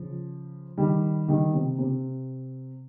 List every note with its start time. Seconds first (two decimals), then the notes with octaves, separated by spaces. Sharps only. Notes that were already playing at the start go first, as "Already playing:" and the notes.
Already playing: C#3 F3
0.78 D#3 G3
1.28 D#3 G3
1.54 C3
1.79 C3